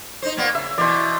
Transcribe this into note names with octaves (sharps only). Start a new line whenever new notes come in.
D#4 C5
A#2 A#3 B3
C#3 E5
B2 E3 C5 D5